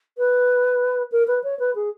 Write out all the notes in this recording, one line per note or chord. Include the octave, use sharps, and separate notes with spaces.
B4
A#4
B4
C#5
B4
G#4